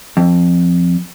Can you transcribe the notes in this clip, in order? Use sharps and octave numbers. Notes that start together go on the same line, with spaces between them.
F2